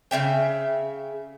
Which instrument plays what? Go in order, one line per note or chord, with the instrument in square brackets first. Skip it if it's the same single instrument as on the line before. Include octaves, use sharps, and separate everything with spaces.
[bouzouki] C#3 C#4 E5 G5